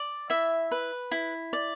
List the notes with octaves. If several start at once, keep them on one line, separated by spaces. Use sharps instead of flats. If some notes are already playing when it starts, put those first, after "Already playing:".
Already playing: D5
E4 E5
B4
E4
D5